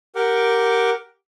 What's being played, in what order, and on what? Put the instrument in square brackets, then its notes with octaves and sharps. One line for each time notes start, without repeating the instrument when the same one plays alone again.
[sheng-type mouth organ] G4 A#4 F#5 G5 D6